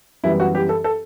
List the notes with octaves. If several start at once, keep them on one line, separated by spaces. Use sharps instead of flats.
F#2 E3 G3 B3 E4
F#4
G4
A4
A4